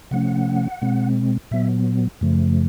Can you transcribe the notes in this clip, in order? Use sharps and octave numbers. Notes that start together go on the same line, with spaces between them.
C3 F3 A3 C#4 F#5
B2 G#3 C4
A#2 F#3 B3 E5
F#2 C#3 F3 A3